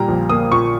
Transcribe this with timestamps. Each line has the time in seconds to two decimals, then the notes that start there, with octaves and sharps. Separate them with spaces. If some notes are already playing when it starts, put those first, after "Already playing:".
Already playing: A#2 G3 A#3 G5 A#5
0.08 A#1
0.30 A#3 D#6
0.52 A#2 C#6